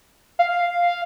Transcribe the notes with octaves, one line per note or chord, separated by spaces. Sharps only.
F5